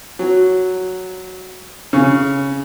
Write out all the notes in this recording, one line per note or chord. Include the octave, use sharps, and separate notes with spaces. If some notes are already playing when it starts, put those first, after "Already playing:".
F#3
C#3